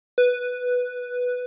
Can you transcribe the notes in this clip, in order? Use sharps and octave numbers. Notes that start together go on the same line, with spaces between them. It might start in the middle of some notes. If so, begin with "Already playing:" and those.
B4